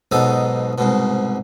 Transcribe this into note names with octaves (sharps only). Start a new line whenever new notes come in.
B1 G#2 B2 D#4 A4
C2 G#2 B2